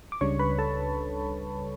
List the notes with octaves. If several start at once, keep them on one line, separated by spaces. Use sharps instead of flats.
D6
C#2 C#3 G3 D4 C#5 C#6
B4 B5
A4 A5